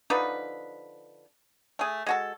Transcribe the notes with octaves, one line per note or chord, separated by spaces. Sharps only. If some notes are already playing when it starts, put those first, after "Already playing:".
D3 F3 D#4 B4
A3 G#4
G#3 F#4 A4